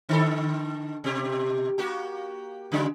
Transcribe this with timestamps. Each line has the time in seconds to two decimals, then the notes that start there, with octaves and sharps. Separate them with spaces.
0.09 D3 D#3 A4
1.04 B2 G4
1.78 A#3 F#4 G4
2.72 C#3 F#3 G#3